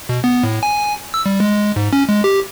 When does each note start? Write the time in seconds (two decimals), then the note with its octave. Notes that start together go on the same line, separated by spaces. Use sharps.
0.09 B2
0.24 B3
0.43 A2
0.63 G#5
1.14 E6
1.26 G3
1.40 G#3
1.76 G#2
1.93 C#4
2.09 G#3
2.24 G4